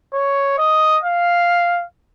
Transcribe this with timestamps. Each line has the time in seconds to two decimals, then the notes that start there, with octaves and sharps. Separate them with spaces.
0.13 C#5
0.58 D#5
1.03 F5